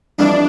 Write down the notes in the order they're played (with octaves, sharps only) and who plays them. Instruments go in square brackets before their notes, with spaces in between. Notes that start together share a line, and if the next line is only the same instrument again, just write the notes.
[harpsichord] F2 E3 G3 [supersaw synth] D4